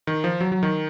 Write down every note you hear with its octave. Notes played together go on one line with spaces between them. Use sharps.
D#3
F3
F#3
F#3
D#3